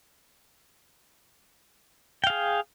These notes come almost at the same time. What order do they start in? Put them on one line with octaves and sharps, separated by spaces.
G5 F5 G#4